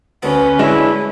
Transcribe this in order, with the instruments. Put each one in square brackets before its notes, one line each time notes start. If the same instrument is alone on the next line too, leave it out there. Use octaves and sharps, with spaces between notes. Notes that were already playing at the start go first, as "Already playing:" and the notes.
[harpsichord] D2 B2 B3 [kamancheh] C#4 B4
[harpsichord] F#2 [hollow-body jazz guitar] G#3 D4 [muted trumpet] E4